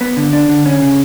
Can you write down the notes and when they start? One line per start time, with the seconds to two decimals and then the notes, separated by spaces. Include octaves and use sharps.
0.01 B3
0.17 D3
0.33 D4
0.49 D3
0.66 C#4
0.82 C#3